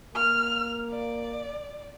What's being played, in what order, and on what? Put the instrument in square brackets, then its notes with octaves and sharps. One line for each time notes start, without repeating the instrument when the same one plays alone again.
[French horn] A#3 [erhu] F6
[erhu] D5